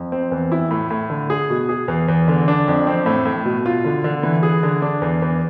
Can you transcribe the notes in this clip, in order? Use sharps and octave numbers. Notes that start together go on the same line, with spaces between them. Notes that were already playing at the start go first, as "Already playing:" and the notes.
Already playing: F2
C4
E2
E4
A2
A2
D3
G#4
B2
G#4
E2
E2
D3
D4
F2
C4
A2
A2
B2
F4
D3
D3
E3
G#4
D3
D4
E2
E2